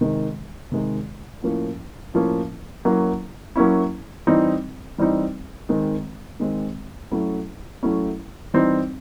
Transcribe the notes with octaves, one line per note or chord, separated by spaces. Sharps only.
C3 D#3 G#3
C3 D#3 G#3
A2 F3 A#3 C#4
A2 F3 A#3 C#4
F#3 A#3 C#4 E4
F#3 A#3 C#4 E4
E3 G3 C4 D#4
E3 G3 C4 D#4
D#3 G#3 C4
D#3 G#3 C4
F#3 A3 C#4 E4
F#3 A3 C#4 E4
E3 G3 C4 D#4